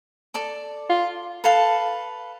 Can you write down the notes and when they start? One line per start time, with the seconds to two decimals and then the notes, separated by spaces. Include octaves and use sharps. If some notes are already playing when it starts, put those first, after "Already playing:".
0.34 A4 D5 A5 D6
0.90 F4
1.44 A4 B4 F5 A5